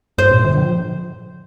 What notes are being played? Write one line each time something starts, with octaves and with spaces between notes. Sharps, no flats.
G2 C5
A#2
D3
F3